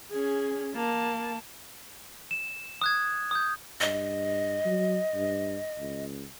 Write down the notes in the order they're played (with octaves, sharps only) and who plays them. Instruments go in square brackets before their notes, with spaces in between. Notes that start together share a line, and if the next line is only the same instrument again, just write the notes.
[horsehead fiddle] C#4 G#4
A#3 A5
[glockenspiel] E7
D#6 F#6 G#6
D#6 G6
[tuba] G2 [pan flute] D#5
[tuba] F#3
G2
C#2